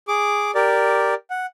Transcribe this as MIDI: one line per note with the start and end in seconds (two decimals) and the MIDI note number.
0.08 0.51 68
0.08 0.51 86
0.55 1.14 67
0.55 1.14 70
0.55 1.14 74
1.30 1.46 78